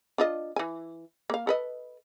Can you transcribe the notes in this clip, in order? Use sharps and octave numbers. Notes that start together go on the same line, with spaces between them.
D4 F4 D#5
E3 G#5
A#3 F5
A4 B4 D#5